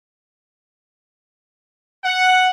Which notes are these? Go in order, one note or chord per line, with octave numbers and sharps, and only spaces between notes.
F#5